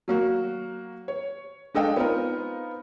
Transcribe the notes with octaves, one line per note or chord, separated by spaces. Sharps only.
F#3 A#3 F#4
C#5
G#3 D4 A4 D#5 F5 G5
B3 C4 D#4 F4 A#4